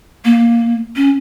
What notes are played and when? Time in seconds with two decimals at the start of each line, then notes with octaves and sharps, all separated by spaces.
0.25 A#3
0.96 C#4